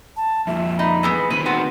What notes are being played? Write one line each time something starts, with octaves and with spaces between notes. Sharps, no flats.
A5
F2 A#2 E5
D#4 B5
E3 G#3 B3
A#2 D#3 C4 B4
B3 F#4 C6